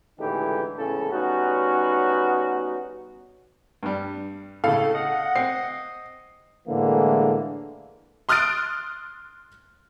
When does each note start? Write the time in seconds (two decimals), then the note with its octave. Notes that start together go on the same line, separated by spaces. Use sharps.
0.19 C#2 A2 D3 E3 D#4 G4
0.78 G#1 E2 A2 C#3 C#4 A4
1.12 G3 B3 C#4 D#4 F#4
3.83 G2 G3
4.64 A2 C#3 A4 F5
4.95 D#5 F#5
5.36 C4 C7
6.68 A2 D3 E3 G#3 A#3
8.29 C6 D#6 F6 F#6 A6 D7